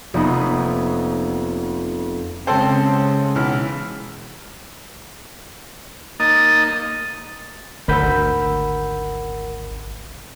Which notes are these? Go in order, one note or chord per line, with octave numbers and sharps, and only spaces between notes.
F1 F2 A#3 B3 D#4 B5
C#3 G#3 C4 A4 C5
B1 E3 F6
A#3 D#4 D#5 A6
G#1 D2 A#4 F#5 B5 E6 G6